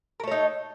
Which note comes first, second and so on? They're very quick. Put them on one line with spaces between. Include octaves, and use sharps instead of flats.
A#4 A3 C#5 D#4